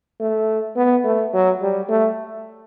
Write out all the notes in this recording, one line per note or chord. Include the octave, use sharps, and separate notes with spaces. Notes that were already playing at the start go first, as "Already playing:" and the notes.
A3
B3
A3
F#3
G3
A3